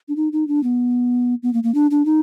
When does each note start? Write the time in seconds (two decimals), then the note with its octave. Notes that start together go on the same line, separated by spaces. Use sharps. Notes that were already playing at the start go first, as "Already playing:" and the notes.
0.09 D4
0.16 D#4
0.33 D#4
0.48 D4
0.63 B3
1.43 B3
1.53 A#3
1.63 A#3
1.74 D4
1.91 D4
2.06 D#4